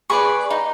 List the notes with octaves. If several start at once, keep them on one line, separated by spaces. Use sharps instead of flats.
G#4 B4 D5 C#6
D#4